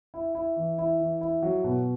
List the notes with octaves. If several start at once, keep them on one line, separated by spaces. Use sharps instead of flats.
E4
E4
E3
E4
E3
E4
F#3
B2